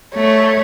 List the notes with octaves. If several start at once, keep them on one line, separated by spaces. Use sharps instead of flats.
A3 C#5